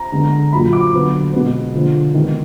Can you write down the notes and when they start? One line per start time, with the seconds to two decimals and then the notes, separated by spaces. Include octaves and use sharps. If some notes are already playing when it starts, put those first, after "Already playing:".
Already playing: A#5
0.12 D3 G#3 B3
0.52 A#2 F#3 A#3 B5
0.73 D6
0.93 D3 F#3 B3
1.33 B2 G#3 B3
1.74 D3 F3 A#3
2.14 D#3 G#3 B3